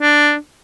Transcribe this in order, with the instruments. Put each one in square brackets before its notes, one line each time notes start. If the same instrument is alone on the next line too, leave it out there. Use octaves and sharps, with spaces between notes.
[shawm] D4